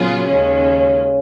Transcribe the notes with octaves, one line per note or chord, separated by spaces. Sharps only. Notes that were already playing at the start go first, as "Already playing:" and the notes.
Already playing: A#2 C#3 F#3 B3 F4 G#4
D#2 D#3 G#3 C#4